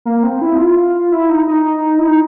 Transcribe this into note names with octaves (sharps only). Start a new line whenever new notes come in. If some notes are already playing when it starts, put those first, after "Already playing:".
A#3
C4
E4
F4
E4
D#4
D#4
E4
D#4